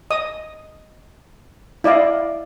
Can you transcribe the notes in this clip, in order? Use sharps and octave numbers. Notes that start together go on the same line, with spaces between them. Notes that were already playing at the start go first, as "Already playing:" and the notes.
D#5 D#6
E4 D5 D#5 F5